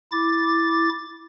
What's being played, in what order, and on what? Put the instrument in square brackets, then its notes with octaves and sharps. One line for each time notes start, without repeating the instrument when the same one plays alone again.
[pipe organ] E4 D6 A6